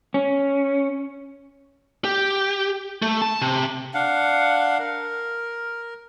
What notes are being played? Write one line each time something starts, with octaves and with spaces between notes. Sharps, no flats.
C#4
G4
A3
A5
C3
D4 F5 F#5
A#4